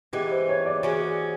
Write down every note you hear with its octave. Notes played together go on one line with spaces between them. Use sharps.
E3 G#3 B3 G4
C5
C#5
D5
E3 G#3 C#4 F#4